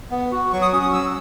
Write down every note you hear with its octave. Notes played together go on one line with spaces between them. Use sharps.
B3
F#4
F#3 C#6
D#6
C#4 F#4 D#6
D#6
F#3 E6